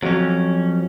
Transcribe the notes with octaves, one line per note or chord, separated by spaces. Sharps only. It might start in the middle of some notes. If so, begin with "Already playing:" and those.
F2 F#3 C#4